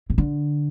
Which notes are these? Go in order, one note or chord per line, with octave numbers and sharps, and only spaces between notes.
C3
D3